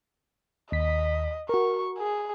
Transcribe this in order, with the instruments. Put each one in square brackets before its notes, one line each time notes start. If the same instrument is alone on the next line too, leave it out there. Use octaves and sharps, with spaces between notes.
[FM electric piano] D#2 B6 [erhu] D#5
[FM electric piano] F#4 A#4 [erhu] C#6
[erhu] G#4